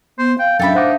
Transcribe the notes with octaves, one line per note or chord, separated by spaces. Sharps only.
B3 C5
F5 G5
F#2 A2 D4 A4 E5 G5 B5
D#4 C5 F#5 D6